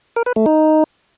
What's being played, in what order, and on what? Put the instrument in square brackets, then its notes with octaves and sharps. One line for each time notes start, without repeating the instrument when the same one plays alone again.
[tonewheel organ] A#4
B4
A3
D#4